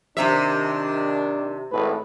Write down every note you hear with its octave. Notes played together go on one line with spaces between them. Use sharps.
C3 D#3 D4 E5
G#1 A2 B4